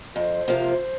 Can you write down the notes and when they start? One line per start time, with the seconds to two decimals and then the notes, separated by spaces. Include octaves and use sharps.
0.16 F2 C5
0.48 C3 F3 A#3 F4